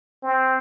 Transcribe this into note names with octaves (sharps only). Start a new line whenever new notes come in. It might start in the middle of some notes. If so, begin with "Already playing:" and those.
C4